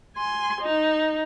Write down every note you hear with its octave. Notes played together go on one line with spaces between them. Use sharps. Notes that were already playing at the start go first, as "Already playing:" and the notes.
G#5 C6
D#4